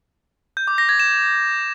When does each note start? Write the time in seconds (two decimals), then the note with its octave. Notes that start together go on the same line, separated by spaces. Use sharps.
0.57 G6
0.68 D6
0.78 A#6
0.89 G#6
1.00 E7